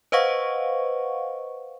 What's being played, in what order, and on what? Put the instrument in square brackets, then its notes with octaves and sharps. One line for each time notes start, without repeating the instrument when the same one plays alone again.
[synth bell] B4 C5 D#5 F5 F#5 C#6